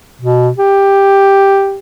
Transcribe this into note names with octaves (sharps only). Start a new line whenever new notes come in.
B2
G4